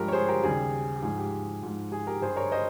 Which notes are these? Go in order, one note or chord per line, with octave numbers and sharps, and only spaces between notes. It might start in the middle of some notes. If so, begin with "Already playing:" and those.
Already playing: G2 F3 G#3 G4 A#4
C#5
G#4 C5
G4 A#4
D#2 C#3 G3 G#4
G4
G#2 F3 G#3 G#4
G4
G#2 F3 G#3
G#4
G4 A#4
G2 G3 G#4 C5
A#4 C#5
C5 D#5